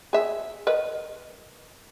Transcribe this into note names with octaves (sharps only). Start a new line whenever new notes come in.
G#4 E5
A#4 B4 D#5